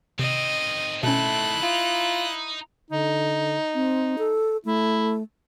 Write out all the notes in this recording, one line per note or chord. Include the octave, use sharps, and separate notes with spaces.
C3 D#3 C4 D#5
B2 A3 C#4 E4 F#6
D#4 F4
D3 D#4
C4
A4
A3 E4